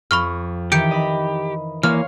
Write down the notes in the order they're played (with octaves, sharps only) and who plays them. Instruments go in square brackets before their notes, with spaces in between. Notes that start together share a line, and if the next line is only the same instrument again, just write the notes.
[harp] F2 [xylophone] B5 C#6 F6
[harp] D#3 E3 [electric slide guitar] G4 [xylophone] G6 C#7 D7
[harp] D#5 B5
[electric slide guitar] E3 A#3 [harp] C#5 F5 C6 [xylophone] F6